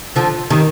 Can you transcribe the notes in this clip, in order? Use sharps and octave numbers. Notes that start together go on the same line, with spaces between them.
D3 F3
D#3 G3